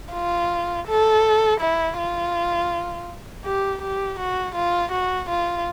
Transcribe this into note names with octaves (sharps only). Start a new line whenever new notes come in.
F4
A4
E4
F4
G4
G4
F#4
F4
F#4
F4